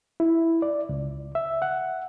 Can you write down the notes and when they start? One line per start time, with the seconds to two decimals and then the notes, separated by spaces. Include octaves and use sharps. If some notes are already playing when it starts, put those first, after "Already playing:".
0.20 E4
0.62 D5
0.89 C#2
1.35 E5
1.62 F#5